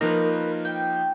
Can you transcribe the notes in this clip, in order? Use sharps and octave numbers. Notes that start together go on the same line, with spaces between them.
F3 A#3 D#4 A#4 B4
G5